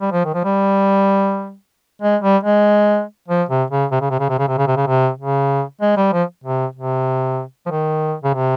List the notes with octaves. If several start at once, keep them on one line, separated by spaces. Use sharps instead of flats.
G3
F3
D#3
F3
G3
G#3
G3
G#3
F3
C3
C#3
C3
C#3
C3
C#3
C3
C#3
C3
C#3
C3
C#3
C3
C#3
G#3
G3
F3
C3
C3
F3
D#3
C#3
C3